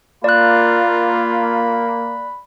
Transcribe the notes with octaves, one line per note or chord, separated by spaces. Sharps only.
A#3 F4 D5 B5 F#6